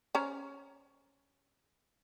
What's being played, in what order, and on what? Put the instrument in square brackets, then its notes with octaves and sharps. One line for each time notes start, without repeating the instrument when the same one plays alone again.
[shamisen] C#4 C5 A#5